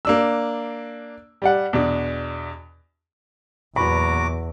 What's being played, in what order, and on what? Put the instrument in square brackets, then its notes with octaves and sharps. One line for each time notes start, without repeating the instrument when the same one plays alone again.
[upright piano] A#3 D4 E6
G3 D5 F#5
E2 B2 D4
[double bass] E2 [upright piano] A#2 F#3 B3 [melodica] F#4 A#5 D6 [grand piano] B5